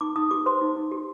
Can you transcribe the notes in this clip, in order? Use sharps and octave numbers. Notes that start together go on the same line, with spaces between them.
D#4 D6
D#4 D#6
G4 D6
C5 C6
D#4
D#4
G4